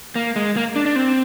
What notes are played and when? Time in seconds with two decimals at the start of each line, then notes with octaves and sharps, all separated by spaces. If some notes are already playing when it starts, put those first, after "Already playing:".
0.16 A#3
0.36 G#3
0.57 A#3
0.76 D4
0.86 D4
0.96 C4